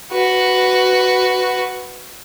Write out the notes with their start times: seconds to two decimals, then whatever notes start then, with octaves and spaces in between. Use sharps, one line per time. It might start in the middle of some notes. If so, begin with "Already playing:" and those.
0.12 F#4 B4